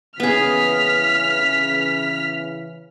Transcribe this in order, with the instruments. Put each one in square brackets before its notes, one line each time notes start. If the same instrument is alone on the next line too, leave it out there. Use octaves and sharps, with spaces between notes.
[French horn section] C#3 E3 [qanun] B3 G#4 [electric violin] F6 B6